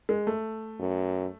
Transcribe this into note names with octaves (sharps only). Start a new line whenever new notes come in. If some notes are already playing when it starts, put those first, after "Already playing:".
G#3
A3
F#2